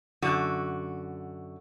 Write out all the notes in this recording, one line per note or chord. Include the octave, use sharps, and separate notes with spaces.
F#2 D3 F#4